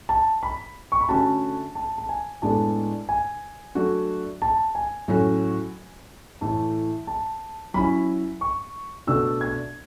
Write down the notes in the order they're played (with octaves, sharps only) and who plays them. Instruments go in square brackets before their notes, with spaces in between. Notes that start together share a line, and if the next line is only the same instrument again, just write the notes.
[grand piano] A5
B5
C#6
B5
[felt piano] D3 A3 C#4 F#4 [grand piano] A5
[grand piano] A5
A5
G#5
[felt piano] A2 G#3 B3 D4 [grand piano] A5
[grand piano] G#5
[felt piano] F#3 A3 D4 F#4
[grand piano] A5
G#5
[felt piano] A2 F#3 C#4 F#4
[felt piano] A2 E3 A3 [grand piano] A5
[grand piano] A5
[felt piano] F#3 C#4 E4 [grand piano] B5
[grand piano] C#6
[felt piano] B2 A3 D4 F#4 [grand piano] E6
[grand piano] G#6